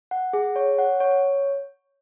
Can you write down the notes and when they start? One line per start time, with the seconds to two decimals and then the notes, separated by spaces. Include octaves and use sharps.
0.11 F#5
0.33 G#4
0.56 C#5
0.78 F#5
1.00 C#5